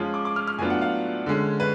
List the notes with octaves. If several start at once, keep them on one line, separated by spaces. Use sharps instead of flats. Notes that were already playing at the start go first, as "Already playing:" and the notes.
Already playing: F3 G#3 C#4 F4
D6
D6
F6
F6
A2 F#3 B3 D4 F4 G#5
F#5
F5
D3 G#3 C#4
B4